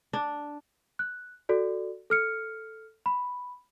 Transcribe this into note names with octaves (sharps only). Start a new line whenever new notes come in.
D4
F#6
F#4 A4 D5
A4 F6 C#7
B5